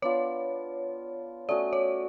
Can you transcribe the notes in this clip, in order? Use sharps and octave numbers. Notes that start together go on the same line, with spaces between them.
B3 D4 F4 C#5
A3 C#4 F#4 D5
C#5